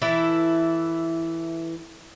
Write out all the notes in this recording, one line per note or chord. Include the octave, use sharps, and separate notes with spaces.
E3 E4 A4